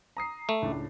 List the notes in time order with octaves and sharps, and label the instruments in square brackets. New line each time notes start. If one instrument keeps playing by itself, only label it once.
[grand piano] A#5 D#6 C7
[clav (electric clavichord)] A3
[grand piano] C#2 A2 D4